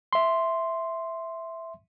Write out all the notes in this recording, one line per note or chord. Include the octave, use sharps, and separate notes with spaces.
E5 C6